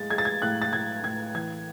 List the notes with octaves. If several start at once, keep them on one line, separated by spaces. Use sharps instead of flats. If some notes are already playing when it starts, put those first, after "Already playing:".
Already playing: A2 G#3 A6
G#3 G#6
A6
G#6
A2 F#6
A6
A2 G#6
A2 G#6
E3 G#6